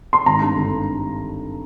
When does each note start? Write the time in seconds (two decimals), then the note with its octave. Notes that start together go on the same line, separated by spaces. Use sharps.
0.13 C6
0.26 G#1 A#5
0.42 G2
0.56 D3